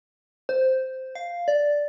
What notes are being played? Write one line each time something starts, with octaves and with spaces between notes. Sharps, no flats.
C5
F5
D5